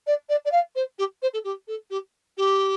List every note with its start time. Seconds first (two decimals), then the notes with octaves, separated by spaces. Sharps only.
0.06 D5
0.29 D5
0.45 D5
0.51 F5
0.75 C5
0.98 G4
1.22 C5
1.33 A4
1.44 G4
1.67 A4
1.90 G4
2.37 G4